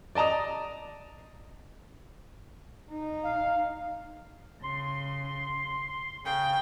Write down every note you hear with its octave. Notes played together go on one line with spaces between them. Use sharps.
D5 D#5 A5 A#5 D#6
D#4
F5
C#3 C6
C#3 G5